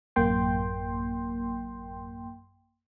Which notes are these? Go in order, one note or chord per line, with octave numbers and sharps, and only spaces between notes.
A1 F#2 A#3 G5 C6